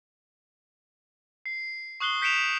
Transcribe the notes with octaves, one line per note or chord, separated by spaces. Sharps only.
C7
C#6 D#6 F#6 C7 G7
G6 B6 C#7 D7 E7 F7